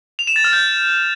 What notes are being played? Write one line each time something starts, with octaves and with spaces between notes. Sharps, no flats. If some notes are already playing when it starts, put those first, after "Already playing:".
F7
E7
A6
F6
G6